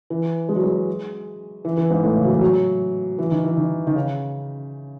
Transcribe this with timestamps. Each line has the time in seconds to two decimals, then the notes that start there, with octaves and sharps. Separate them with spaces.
0.10 E3
0.49 G#3
0.56 F#3
0.63 G#3
1.65 E3
1.77 E3
1.90 G#2
2.03 A2
2.16 C#3
2.24 F#3
2.29 E3
2.41 F#3
3.18 E3
3.31 D#3
3.44 E3
3.57 D#3
3.87 D#3
3.96 C#3